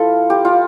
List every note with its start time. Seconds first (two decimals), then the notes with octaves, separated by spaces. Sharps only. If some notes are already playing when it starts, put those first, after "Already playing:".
Already playing: F3 E4 F4 A4 B4
0.30 G4
0.45 F4